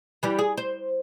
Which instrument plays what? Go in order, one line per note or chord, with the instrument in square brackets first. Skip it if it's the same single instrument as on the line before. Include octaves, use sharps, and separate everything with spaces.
[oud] E3 G3
G#4
C5